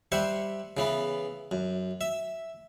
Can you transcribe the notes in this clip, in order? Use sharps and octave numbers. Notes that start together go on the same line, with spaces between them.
G3 C5 E5 F#5
C#3 E3 B3
F#2
E5